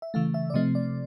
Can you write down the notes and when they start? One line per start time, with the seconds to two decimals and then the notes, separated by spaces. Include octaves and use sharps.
0.02 E5
0.14 C#3 E3 A3 F5
0.34 E5
0.50 D5
0.54 C3 F3 A3 C4 D#5
0.75 D5